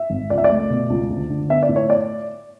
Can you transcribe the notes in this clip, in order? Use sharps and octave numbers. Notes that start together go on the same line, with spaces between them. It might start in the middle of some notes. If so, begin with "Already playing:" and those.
Already playing: E5
G#1
C#2 D5
E5
D5
A3
B2
C#2
D2
D3
B3 E5
D5
A2
C#5
D5